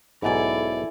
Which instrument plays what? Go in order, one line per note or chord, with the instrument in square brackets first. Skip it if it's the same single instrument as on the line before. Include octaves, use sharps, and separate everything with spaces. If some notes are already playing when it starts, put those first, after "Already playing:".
[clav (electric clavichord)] B1 G#2 [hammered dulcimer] E4 G#5 [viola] A4 D5